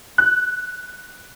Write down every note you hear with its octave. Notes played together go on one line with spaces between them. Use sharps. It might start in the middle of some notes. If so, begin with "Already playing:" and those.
F#6